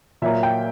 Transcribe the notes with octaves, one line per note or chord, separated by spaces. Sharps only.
A#2 F#3 A#3 E5
G5